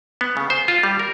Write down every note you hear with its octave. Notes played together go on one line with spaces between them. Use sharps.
B3
C#3
C5
F4
G3
A#4